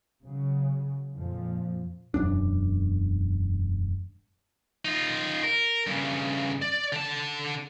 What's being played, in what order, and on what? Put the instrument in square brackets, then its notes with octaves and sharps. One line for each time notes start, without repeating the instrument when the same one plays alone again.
[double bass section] C#3 F#3
F2 A#2 F3
[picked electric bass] E1 F#2 D4
[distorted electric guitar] D#4 F4
A#4
G2 C#3
D5
D3 A5